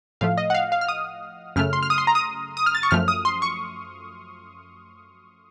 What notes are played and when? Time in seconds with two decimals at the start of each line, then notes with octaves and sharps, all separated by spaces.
0.21 A2 F3 A3 F5
0.38 D#5
0.50 F#5
0.55 F5
0.72 F5
0.81 F6
0.88 D#6
1.56 F#2 C#3 A3 F6
1.73 C6
1.83 F6
1.90 D#6
1.98 C6
2.07 A#5
2.15 D#6
2.57 D#6
2.66 F6
2.75 A6
2.83 C#6
2.91 F#2 F3 A3 F6
3.08 D#6
3.25 C6
3.42 C#6